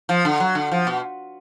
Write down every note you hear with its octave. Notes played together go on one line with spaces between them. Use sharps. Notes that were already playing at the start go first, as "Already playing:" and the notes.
F3
D3
F#3
D3
F3
B2